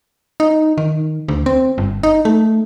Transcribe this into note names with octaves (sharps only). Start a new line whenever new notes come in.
D#4
D#3
D2
C4
G1
D#4
A3